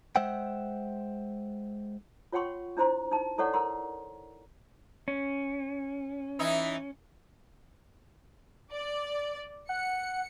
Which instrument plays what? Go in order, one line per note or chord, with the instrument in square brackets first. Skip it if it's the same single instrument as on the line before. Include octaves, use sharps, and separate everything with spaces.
[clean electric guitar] G#3 C5 E5 F#5 G5
[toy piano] F4 C#5 F#5 G5 C6 C#6
D4 E4 C5 A#5 C6
D#4 A5
E4 A4 C#5 D5 F#5 C#6
A#4 F#5 A#5 C6
[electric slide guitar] C#4
[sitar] E3 D#4 E4
[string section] D5
[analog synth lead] F#5 [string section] C#7